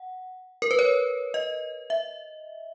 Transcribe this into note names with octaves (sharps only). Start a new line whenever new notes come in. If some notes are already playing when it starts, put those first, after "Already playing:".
Already playing: F#5
A#4
B4
C#5
D#5
E5